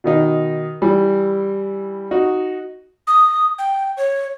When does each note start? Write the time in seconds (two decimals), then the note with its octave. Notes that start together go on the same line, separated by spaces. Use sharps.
0.04 B2 D#3 D#4
0.82 E3 G3
2.11 D#4 F#4
3.07 D#6
3.59 G5
3.97 C#5